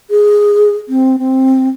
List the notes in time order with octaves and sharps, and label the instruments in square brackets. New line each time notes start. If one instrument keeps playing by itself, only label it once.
[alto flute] G#4
C4
C4